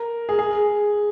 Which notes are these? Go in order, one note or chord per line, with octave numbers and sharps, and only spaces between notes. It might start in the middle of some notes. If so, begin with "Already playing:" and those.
Already playing: A#4
G#4
G#4